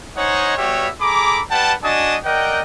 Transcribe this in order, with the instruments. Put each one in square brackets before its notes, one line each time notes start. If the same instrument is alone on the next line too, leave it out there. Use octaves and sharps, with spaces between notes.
[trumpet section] D#4 C5 C#5 D#5 F#5 G#5
G3 B3 F#4 G4 C#5 E5
G#4 A4 A#5 B5 D6
G3 B4 F#5 G5 A5
D4 F#4 D#5 G#5 A5 D#6
A#4 D5 D#5 F#5 G5